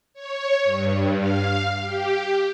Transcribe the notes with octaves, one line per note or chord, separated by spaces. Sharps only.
C#5
G2
F5
G4